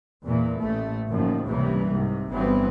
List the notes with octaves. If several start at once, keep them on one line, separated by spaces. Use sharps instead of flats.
E2 A#2 E3 A#3
A1 A3
F#1 F#2 D#3 F3
C#2 G2 C3 E3 G3 A#3
C2 G#2 C3
G1 G2 E3 F#3 B3 C4